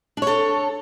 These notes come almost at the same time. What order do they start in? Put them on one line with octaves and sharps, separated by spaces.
D4 C#5 A4